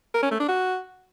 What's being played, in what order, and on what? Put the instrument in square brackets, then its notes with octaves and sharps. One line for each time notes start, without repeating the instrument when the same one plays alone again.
[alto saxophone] A#4
C#4
A3
D4
F#4